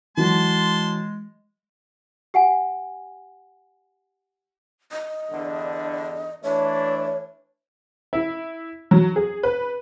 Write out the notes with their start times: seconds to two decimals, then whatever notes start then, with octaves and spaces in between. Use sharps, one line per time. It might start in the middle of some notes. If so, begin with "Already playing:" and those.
0.17 E3 F#3 G#3 A5 C6
2.34 G4 F#5 G#5
4.92 D#5
5.31 E2 G2 D3
6.43 E3 A3 D4 C#5
8.13 E4
8.91 F#3
9.16 G#4
9.43 B4